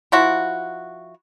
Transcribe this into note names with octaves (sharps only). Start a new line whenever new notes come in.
F3 E4 F#4